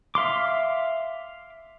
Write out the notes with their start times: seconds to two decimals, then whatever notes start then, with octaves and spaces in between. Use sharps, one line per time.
0.15 E5 F5 C6 D6